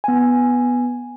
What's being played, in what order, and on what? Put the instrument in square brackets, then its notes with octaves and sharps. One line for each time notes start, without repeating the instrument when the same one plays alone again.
[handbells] B3 G#5